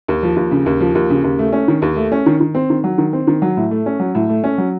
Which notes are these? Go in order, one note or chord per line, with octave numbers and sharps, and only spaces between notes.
D#2
F3
D#2
C#3
D#2
F3
D#2
C#3
D#2
A3
C#4
D#3
D#2
A3
C#4
D#3
D#3
C4
D#3
F#3
D#3
C4
D#3
F#3
A2
A3
C#4
F#3
A2
A3
C#4
F#3